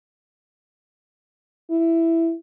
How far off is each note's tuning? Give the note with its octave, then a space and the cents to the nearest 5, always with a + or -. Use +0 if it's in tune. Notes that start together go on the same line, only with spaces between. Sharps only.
E4 +5